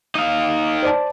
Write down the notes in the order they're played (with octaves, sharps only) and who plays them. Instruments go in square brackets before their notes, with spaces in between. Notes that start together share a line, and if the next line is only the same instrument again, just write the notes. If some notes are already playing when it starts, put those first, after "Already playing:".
[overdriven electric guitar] D#4 F5
[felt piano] C5 D5 A5